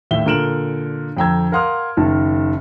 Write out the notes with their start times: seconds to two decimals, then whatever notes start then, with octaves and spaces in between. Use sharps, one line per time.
0.11 D#2 A2 E5 G7
0.26 A#2 D3 A#4 D7 E7 F#7
1.17 F2 D3 G5 A#5 E6 G#6
1.52 A#4 F5 F#5 C6 D#6 F6
1.97 F#1 D#3 A5